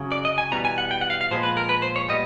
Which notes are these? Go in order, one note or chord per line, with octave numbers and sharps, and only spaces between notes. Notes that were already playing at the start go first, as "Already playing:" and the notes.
Already playing: F#2 C#3 F#3
D5
D#5
G#5
E2 B2 G3 B3 A#5
G#5
F#5
G5
F#5
F5
F5
A#2 F3 G#3 B3 C5
B4
A#4
B4
C5
C#5
A#2 G3 B3 D#5